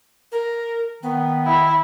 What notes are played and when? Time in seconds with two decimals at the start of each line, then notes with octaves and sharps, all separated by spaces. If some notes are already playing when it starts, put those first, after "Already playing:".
0.32 A#4
1.03 D#3 B3
1.46 E4